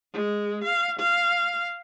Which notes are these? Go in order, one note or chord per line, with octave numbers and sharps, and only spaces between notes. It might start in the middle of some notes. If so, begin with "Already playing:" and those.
G#3
F5
F5